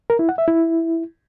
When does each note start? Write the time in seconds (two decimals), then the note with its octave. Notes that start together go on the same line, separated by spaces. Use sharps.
0.10 A#4
0.19 E4
0.29 F#5
0.38 E5
0.48 E4